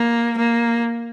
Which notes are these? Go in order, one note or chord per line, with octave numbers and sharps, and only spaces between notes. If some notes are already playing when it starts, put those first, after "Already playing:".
Already playing: A#3
A#3